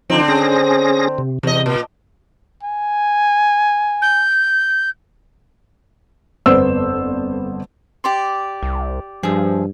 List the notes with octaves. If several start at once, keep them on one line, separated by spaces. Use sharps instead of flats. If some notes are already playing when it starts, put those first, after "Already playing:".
D3 F3 C4 D#4
C#4 G#4 A#6
C3
E2 C3 D#5
A#2
G#5
G6
G1 F2 B3 C5 D5 E6
G4 D5 C6
C2
G2 F3 G#4 E5